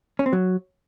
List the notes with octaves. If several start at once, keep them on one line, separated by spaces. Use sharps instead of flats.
C#4
C4
F#3